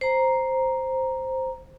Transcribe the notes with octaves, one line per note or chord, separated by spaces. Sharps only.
C5 A#5